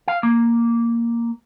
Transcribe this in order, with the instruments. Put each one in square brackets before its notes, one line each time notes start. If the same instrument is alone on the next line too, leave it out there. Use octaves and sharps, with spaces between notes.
[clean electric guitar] F5
A#3